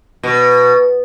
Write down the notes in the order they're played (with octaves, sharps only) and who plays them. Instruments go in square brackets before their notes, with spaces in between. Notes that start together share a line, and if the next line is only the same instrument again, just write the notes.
[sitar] B2